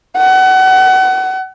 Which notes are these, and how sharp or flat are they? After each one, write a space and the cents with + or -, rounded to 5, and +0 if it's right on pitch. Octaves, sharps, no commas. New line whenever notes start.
F#5 +30